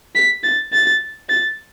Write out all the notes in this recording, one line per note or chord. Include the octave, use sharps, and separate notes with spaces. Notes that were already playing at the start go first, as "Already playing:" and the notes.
B6
A6
A6
A6